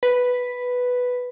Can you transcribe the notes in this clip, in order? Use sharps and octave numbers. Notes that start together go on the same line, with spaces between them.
B4